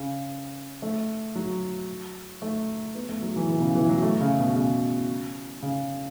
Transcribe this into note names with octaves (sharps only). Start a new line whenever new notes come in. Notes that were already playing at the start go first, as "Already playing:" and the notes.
Already playing: C#3
A3
F#3
A3
B3
A3
F#3
E3
E3
B2
C#3
E3
F#3
A3
C#3
B2
C#3
C#3